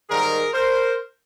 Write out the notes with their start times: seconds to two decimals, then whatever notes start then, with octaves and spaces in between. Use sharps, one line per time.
0.09 G#2 D#3 G3 G#4 A#4
0.53 A#4 C5